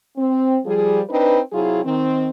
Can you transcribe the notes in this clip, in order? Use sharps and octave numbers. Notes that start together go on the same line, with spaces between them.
C4
F3 G3 G#4
C4 D4 D#4 B4
C3 F#3 E4 F4 G#4
D#3 C4